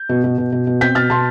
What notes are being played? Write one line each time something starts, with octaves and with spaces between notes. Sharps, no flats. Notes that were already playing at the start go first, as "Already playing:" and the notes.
Already playing: G6
B2
B2
B2
B2
B2
C4 G6 B6
B2 F6 A6
B2 A5 C6